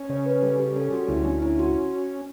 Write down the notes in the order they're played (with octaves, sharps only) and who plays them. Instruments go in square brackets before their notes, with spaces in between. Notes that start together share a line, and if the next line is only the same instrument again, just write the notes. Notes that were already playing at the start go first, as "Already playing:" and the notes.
Already playing: [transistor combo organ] C#4
[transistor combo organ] C#3 [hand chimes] C#5
[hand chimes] B4
[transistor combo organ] G3 [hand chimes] A4
[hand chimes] G4
[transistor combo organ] C#4 [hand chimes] A4
[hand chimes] F#4
[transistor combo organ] D2 [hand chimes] E4
[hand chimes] D4
[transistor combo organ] C#4 [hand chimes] E4
[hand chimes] F#4